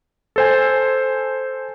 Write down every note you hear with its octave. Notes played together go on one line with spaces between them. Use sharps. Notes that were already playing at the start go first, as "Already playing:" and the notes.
A4 C5 G#5